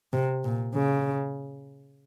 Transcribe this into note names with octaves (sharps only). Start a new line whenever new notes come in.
C3
A#2
C#3